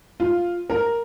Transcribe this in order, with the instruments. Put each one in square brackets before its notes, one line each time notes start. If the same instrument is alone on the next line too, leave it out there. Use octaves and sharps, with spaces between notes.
[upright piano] F4
A#4